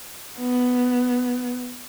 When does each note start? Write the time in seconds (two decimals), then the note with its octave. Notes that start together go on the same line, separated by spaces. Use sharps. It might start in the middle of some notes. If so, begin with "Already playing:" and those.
0.38 B3